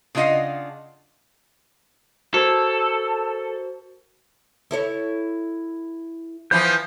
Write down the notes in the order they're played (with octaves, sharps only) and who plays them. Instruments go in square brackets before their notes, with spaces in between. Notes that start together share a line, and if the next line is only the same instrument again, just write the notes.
[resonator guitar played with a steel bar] C#3 D4 F4 D#5 F5 F#5
[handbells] F#4 A#4 C5 [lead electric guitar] A4
[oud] E4 A4 C#5
[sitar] E3 F3 B3 [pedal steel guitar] G6